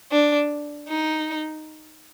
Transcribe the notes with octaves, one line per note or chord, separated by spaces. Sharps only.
D4
D#4